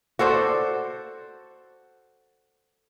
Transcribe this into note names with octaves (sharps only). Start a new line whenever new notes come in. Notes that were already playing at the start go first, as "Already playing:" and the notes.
F#4 A4 C5 D5